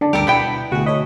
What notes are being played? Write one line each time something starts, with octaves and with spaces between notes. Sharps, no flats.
D3 D5 A5
D2 G2 G4 A4 A#4
B2 B3 E4 G5 G6 B6
D2 B2 F#4 G#4
A4 C#5 D#5 B5